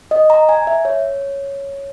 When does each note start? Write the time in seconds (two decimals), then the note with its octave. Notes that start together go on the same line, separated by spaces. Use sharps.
0.11 D#5
0.30 A#5
0.49 G#5
0.67 E5
0.85 C#5